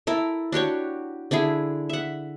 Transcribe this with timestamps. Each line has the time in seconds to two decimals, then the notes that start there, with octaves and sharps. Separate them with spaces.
0.07 E4 A4 A#4
0.52 D4 F#4 G4 C#5
1.31 D3 D4 E4 G#4
1.89 E5 F#5